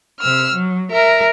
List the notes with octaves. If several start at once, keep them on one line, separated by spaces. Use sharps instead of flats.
C3 E6 F6
F#3
A#4 E5